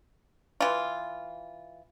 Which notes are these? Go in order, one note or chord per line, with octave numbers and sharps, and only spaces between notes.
E3 F4